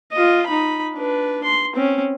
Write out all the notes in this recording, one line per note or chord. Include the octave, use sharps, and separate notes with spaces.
F4 D#5
D#4 B5
D4 B4
C6
C4 C#4